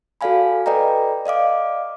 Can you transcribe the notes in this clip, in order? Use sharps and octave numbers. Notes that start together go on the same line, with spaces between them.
F#4 A4 D5 F5 G#5 B5
A4 B4 D5 D#5 G5 A#5
D5 D#5 F5 D6